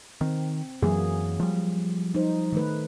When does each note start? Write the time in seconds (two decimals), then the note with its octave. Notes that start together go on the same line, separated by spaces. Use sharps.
0.21 D#3 C4
0.82 F#2 E3 F#3 A#3 G#4
1.40 F3 G3
2.15 D#4 C5
2.53 D#3 A3 B4